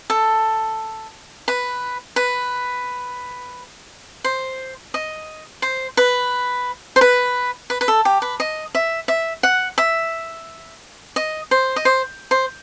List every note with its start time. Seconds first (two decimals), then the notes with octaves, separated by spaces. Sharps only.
0.10 A4
1.48 B4
2.16 B4
4.24 C5
4.94 D#5
5.62 C5
5.97 B4
6.96 C5
7.01 B4
7.70 B4
7.81 B4
7.88 A4
8.05 G4
8.22 B4
8.40 D#5
8.75 E5
9.08 E5
9.43 F#5
9.78 E5
11.16 D#5
11.51 C5
11.76 D#5
11.85 C5
12.31 C5